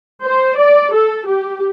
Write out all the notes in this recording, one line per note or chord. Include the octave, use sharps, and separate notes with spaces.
C5
D5
A4
G4